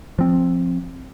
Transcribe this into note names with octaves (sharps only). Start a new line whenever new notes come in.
F3 C4